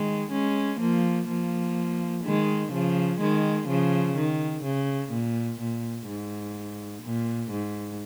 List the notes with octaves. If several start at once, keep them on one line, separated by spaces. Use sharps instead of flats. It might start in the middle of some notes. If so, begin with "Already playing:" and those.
Already playing: D#3 G#3
G#3 C#4
F3 A#3
F3 A#3
D#3 G#3
C#3 F3
D#3 G#3
C#3 F3
D#3
C#3
A#2
A#2
G#2
A#2
G#2